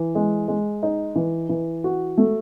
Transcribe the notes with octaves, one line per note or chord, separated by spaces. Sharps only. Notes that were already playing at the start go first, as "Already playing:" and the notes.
Already playing: E3
G#3
G#3
D#4
E3
E3
F#4
A3